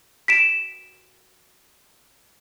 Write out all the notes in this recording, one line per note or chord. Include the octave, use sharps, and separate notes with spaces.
B6 D7 E7